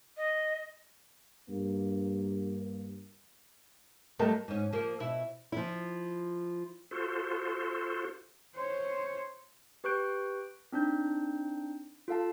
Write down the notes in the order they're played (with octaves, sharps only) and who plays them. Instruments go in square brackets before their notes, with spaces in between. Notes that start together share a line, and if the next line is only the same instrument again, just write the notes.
[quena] D#5
[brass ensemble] G2 A#3
[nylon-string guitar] F#3 G3 A3 [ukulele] A#4 D#5 A5
[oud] G#2 C#4
F3 A#3
B2 E4 E5
[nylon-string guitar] F3 E4
[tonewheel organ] F4 F#4 A4 C5
[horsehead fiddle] C5 C#5
[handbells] G4 B4 C#6 F#6 G6 D7
C4 D4 D#4 G6
F4 A4 F5 A5